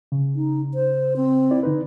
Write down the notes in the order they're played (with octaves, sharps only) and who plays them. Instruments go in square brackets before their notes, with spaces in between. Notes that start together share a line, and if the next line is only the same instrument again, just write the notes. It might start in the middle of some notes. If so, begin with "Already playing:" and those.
[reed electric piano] C#3
[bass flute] D#4
C5
C4
[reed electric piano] E4 D5
D3 D#4 B4